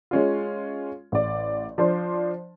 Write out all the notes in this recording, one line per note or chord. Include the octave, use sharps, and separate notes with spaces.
G#3 C#4 F4
A1 D5
F3 D4 C5